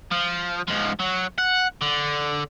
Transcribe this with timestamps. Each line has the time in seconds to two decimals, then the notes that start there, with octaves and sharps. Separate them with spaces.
0.12 F3
0.68 G#2 F3
1.00 F#3
1.38 F#5
1.81 D3